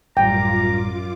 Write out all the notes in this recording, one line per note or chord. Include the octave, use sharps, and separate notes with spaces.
A1 F#2 A2 G3 F4 G5 A#5 D6